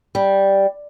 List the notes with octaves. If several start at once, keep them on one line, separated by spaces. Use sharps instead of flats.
G3